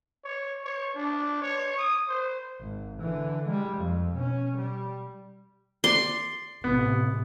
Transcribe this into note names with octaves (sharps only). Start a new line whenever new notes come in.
C#5
C#5
D4
C#5
D#6
C5
G#1
D3 E3
G3 G#3
F2
B2 C#4
G3
D5 C6
A1 C3 B3